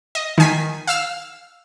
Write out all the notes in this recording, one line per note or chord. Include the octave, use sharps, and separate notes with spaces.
D#5
D#3 G#5 B6
F5 E6 F6